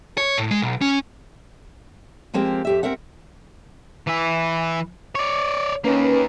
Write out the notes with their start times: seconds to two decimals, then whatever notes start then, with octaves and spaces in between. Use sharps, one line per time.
0.18 C#5
0.38 A2
0.51 G#3
0.62 B1
0.81 C#4
2.34 F3 G#3 A#3 C4 G4
2.65 F2 G4 E5
2.83 C4 A#4 E5 F#5
4.07 E3 E4
5.15 C#5 D5
5.85 D#3 A#3 C#4 B4